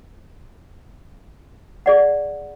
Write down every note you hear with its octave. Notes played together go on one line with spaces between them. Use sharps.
G#4 D5 F#5